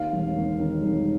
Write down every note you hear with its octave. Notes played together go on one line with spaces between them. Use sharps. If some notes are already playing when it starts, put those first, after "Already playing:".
Already playing: D#2 F5
E1
D#2
D#3
E1